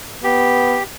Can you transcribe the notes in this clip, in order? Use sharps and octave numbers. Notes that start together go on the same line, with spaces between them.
B3 G4